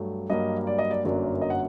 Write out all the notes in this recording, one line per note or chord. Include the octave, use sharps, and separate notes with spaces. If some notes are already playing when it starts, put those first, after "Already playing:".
Already playing: G2 F#3 A3
G2 F#3 A#3 D#5
D5
D#5
D5
G1 F#2 F#3 A#3 D5
D#5
F#5